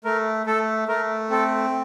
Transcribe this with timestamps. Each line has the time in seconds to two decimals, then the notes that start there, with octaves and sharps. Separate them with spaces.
0.04 A3 A#4
0.46 A3 A4
0.88 A3 A#4
1.30 C4 A4